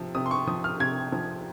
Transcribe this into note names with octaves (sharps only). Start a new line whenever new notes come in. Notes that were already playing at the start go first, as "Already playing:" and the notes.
Already playing: C3 F3
C3 D#6
C6
C#6
F3 D#6
F6
C3 G#6
F3